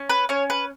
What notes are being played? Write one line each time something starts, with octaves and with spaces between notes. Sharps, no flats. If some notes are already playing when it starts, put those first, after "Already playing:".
Already playing: C#4
B4
C#4 C#5
B4